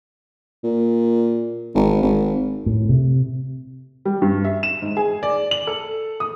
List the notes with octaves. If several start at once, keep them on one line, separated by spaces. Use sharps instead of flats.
A#2
G#1
G#1
A2
C3
G3
G2
E5
E7
G#2
G#4
D5
F#7
A4
D#6